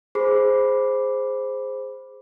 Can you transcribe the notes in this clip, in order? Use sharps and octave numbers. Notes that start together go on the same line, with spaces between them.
G#4 C5 B5 D6 C7